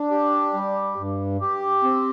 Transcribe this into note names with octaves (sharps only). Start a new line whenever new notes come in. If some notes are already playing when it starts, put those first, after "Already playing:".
Already playing: D4
G4
G3
G2
G4
C4